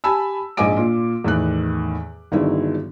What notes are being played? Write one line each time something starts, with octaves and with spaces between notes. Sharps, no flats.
G4 G#5 A5 B5 E6
A#1 G#2 D#5 G#5 D6 D7
A#2 F4
E2 A2 D#3 F#6
G1 D#3 F#3 G#3 D4 E4